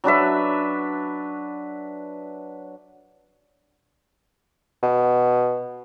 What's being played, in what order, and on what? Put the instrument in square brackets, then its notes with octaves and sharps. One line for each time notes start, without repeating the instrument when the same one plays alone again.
[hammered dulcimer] F#3 D4 B4 E5
[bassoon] B2